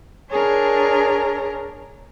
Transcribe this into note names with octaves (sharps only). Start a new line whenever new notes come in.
D4 G#4 A#4 C#5